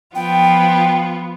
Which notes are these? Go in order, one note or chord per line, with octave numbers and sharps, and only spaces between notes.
F3 B3 F4 G5